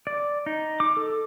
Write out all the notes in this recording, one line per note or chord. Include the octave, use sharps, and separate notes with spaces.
D5
D#4
D6
A4